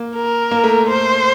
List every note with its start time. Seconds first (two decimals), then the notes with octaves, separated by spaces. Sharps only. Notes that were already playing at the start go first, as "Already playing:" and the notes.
Already playing: A#3
0.16 A#4
0.51 A#3
0.64 A3
0.88 A3 C5